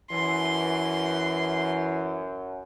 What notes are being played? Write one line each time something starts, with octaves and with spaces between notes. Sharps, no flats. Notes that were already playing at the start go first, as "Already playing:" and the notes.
F#2 E3 C6